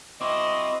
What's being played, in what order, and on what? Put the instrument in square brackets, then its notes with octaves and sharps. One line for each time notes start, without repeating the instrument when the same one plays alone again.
[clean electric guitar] C4 E4 [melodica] F#4 C6 D6 [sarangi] D#5